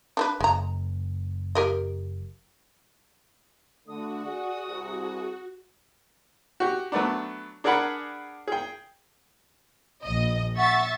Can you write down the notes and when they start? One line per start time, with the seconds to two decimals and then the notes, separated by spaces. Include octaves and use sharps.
0.17 D4 A#4 B4
0.40 F#1 G#3 A#5
1.55 G4 A#4 D#5
3.88 D3 A3 F#4 D#6
4.25 G#4 D5 F#5
4.67 C2 G#4
6.60 F#4 G4
6.92 F#3 A3 B3 D4
7.64 D4 G#4 A#4 D5 F#5 B5
8.48 G#4 G5
10.03 A#1 D#5
10.57 E5 F#5 C#6 A6